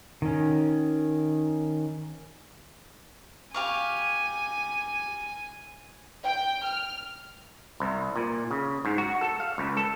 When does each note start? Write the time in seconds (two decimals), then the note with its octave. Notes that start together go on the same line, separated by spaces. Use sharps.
0.22 D#3 C#4
3.54 G4 F5 G#5 C#6
6.24 G5
6.64 F6
7.80 C2
8.16 A#2
8.51 C#3
8.85 G#2
8.98 F#4
9.21 A4
9.40 F5
9.58 C#2
9.77 A4